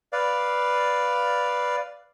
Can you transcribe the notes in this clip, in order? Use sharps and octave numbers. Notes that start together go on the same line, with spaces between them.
B4 D5 F5